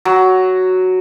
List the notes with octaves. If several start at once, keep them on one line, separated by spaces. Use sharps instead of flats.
F#3